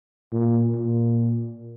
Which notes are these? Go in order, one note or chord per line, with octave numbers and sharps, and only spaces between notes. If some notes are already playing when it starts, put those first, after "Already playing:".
A#2
A#2